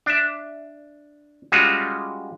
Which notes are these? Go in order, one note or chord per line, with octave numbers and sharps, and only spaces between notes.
D4 E5
G3 G#3 C#4 F4 F#4